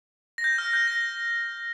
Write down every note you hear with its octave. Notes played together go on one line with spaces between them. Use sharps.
A#6
G6
F6
G6
A#6